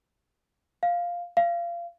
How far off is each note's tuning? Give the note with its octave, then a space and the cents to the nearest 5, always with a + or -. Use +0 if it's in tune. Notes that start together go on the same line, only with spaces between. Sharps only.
F5 +0
F5 -25